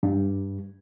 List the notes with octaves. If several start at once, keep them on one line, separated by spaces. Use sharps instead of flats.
G2